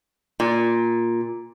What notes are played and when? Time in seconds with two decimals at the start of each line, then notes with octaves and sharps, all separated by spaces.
0.40 A#2